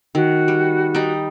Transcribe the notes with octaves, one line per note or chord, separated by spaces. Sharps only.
D#3 F#4
G3
G3 D#4